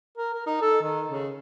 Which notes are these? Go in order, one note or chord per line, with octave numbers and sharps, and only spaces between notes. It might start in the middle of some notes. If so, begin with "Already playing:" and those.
A#4
A#4
D#4
A4
D#3
C#3